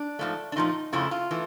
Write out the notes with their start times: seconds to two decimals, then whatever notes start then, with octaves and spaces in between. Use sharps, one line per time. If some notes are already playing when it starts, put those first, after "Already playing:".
Already playing: D4
0.19 G#2 F3 A3
0.52 D4
0.56 A#2 F3 A3 D#4
0.93 F2 C#3 F3 A3 E4
1.11 F4
1.31 E3 A3